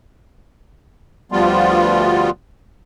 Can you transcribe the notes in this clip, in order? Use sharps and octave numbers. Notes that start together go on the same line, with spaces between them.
D2 F3 G3 B3 F4